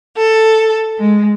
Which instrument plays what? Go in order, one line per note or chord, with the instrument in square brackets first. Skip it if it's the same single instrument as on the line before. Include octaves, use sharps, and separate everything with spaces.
[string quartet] A4
G#3